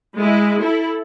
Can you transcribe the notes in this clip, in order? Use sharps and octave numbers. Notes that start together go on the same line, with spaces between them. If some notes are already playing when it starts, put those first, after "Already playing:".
G#3 E4
E4 A4